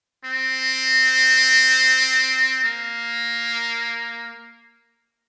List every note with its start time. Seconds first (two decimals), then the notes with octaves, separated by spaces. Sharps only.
0.24 C4
2.64 A#3